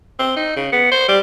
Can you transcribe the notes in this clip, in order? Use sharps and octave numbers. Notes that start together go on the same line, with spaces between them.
C4
D#4
C#3
B3
C5
G3